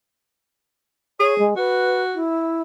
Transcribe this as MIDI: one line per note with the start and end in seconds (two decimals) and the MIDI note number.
1.20 1.45 68
1.20 1.36 73
1.38 1.54 56
1.56 2.22 66
1.56 2.01 71
2.14 2.61 64